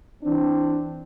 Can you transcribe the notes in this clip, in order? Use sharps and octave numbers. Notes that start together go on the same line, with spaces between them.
E3 C4 D4